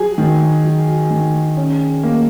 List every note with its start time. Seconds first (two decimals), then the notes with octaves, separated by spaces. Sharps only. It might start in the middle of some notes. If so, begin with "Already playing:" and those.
Already playing: F#3 G#4
0.18 D#3
0.64 F#3
1.11 D#3
1.57 C#4
2.03 A#3